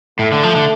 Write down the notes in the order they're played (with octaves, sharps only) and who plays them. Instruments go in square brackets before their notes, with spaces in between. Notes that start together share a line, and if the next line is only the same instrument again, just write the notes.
[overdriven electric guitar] A2 [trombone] A3
[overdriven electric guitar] D3
F3
D3